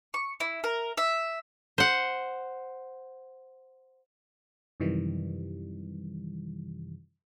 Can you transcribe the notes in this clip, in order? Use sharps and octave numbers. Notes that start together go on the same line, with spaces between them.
C#6
E4
A#4
E5
C5 F#5
F#2 C3 D#3 E3 G3